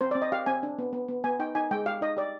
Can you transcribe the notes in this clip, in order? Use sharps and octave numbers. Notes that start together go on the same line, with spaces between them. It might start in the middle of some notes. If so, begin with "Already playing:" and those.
C4 C5
C4 D5
D#5
G4 F5
C4 G#5
D4
B3
B3
B3
B3 G#5
D#4 G5
D#4 G#5
G#3 G5
G4 F5
D#4 D#5
G4 D5